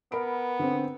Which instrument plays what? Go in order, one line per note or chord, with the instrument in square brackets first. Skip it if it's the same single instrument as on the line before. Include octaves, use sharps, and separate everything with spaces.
[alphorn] B3 [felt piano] A#4 B5 D7
[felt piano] D3 C4